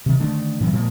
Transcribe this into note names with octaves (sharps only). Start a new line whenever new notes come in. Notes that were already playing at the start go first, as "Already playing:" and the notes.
C3 D#3
D3 D#3 A3 D4
A2 E3 F#3 B3
A#2 F3 G#3 A#3